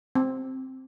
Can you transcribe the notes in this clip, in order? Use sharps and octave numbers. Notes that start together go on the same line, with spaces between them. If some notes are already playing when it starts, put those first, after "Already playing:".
C4